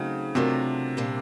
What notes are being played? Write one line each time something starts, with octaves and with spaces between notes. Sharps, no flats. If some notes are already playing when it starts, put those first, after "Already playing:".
Already playing: C#3 F#3 A3 C4 D#4
C3 F#3 A3 D4 F4 A#4
A#2 G3 A#3 D4